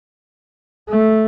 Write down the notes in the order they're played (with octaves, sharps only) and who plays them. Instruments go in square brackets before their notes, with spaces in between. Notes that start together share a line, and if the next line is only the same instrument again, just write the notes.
[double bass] A3